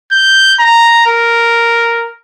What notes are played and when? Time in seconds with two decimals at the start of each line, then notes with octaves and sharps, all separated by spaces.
0.12 G6
0.60 A#5
1.07 A#4